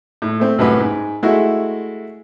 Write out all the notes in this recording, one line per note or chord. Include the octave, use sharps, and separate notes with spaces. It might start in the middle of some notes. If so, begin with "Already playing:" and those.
A2
A3 C4
C2 F#2 A2 F#4 B4
G#2
G#3 A3 E4 F#4